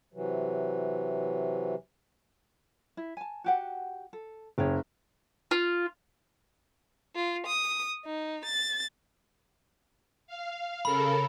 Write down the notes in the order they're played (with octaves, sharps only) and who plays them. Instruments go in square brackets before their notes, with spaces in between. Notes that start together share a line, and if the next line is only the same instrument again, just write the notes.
[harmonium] C3 E3 F#3
[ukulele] E4
G#5 A5
F#4 G4 F#5
A4
[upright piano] F#1 [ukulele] G4 G#4 C#5
[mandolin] F4
[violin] F4
D#6
D#4
A6
[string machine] F5
[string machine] C#3 A4 A#4 [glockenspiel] B5